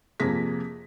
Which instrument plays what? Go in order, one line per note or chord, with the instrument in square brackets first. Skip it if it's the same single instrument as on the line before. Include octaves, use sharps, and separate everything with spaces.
[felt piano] F2 C3 A#3 G#4 A#6 B6